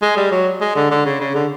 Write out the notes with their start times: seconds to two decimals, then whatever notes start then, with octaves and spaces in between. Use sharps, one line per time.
0.02 G#3
0.17 G3
0.31 F#3
0.61 G#3
0.76 D3
0.91 D3
1.06 C#3
1.20 C#3
1.35 D3